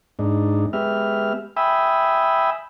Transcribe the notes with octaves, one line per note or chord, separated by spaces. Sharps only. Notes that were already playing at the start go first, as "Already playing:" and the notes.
G#2 D4 D#4
G#3 B3 G4 E5 F6
E5 G5 G#5 B5 D#6 E6